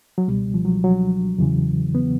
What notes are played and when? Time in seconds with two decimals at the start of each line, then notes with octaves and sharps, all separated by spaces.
0.18 F#3
0.28 C#2 B2 G3
0.54 F3
0.65 F#3
0.84 F#3
1.39 E2 C#3 E3
1.95 B3